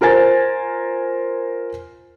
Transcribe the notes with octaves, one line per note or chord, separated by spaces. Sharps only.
F4 A#4 C5 G#5 A6